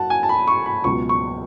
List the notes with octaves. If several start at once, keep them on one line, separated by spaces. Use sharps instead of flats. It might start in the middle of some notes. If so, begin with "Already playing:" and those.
Already playing: F#2 F#3 F#5 A5
G#5
A5
B5
C#6
B5
C#2 B2 F#3 C#6
C#6